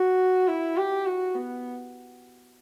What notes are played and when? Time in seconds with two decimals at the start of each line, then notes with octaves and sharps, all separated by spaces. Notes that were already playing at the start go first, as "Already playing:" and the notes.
Already playing: F#4
0.48 E4
0.77 G4
1.06 F#4
1.35 B3